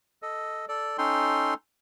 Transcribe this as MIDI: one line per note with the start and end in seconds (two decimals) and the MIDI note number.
0.22 0.65 69
0.22 0.65 75
0.69 0.97 69
0.69 0.97 74
0.98 1.54 61
0.98 1.54 63
0.98 1.54 69
0.98 1.54 79
0.98 1.54 84